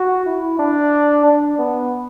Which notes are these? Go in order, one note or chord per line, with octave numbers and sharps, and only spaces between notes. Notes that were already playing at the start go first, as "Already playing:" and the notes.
Already playing: F#4
E4
D4
D4
B3